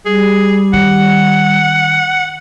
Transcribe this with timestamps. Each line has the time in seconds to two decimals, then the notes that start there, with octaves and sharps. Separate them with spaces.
0.05 G3 G#4
0.74 D#3 F#5